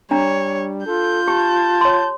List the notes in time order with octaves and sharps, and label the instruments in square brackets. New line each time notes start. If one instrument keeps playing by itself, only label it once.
[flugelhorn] G3 [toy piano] D4 A#5 [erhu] C#5
[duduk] F4 [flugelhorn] A4 [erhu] G6
[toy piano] G4 [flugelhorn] A5
[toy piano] C#5 C6